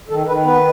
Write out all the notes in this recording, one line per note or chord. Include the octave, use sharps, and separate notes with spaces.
D#3 A4
D#3 B4
B3 B4